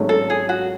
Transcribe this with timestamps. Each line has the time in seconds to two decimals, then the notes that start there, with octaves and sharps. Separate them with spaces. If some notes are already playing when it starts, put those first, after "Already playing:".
Already playing: G#1 G#2 F#3 A3 C#4
0.09 A4
0.30 G#4
0.49 F#4